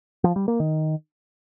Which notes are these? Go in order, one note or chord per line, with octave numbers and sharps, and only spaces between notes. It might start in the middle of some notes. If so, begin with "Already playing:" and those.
F3
G3
A#3
D#3